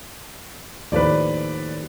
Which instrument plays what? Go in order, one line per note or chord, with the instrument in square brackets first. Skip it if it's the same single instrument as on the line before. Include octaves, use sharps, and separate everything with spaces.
[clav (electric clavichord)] D#2 A2 F3 [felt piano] B4 D5